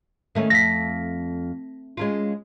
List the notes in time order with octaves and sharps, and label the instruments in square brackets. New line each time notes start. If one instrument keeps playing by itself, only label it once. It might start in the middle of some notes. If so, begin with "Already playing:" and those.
[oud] D#3 A3 C#4
[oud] F2 [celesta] A#6 B6
[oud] G#3 C#4 F4